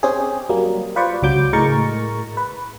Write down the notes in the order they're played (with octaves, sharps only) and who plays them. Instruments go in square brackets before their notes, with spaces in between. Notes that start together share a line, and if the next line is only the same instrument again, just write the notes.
[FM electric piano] C4 C#4 G4 G#4
F#3 G3 A#3
F4 B4 C5 D5 C#6
C#2 F#3 D6 G6
A2 G#3 A#4 C#6 A6
B4